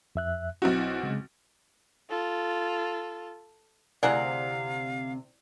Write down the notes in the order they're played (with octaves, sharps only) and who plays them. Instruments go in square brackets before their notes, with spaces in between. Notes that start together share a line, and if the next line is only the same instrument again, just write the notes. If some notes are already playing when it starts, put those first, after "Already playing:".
[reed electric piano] F2 E5 F#6
[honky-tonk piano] B1 C4 F#4 [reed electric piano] E4
[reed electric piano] C#3 G#3
[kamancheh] F4 A4
[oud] D2 C3 [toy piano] E4 D5 [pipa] G#4 A#4 F#5 [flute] F5